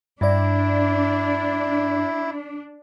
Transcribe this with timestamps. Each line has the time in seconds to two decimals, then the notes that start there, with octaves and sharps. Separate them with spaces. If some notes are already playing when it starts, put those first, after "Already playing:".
0.21 G2 D4 E4 D5